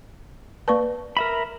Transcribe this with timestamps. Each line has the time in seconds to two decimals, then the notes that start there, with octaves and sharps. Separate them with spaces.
0.68 A#3 B4 D5 A5 C#6
1.17 A#4 E5 B5